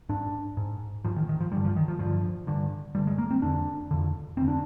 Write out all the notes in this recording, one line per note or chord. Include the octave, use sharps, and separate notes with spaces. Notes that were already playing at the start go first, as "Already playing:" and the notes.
G#2 D4
G#2
G#2 F3
D#3
D#3
F3
G2 D3 G3
F3
D#3
F3
G2 D3 F3
G2 D3
G2 D3 G3
G#3
A#3
C4
F2 D3 D4
F2 D3
F2 D3 C4
D4